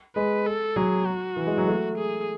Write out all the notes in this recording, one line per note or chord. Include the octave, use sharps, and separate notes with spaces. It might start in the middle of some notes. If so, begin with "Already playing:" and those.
G#3 B4
A4
F#3 G#4
F#4
E3
G#3
F#3
A3
G#4